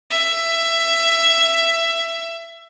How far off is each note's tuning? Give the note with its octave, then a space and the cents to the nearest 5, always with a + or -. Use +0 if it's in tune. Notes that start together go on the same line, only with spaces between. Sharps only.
E5 +15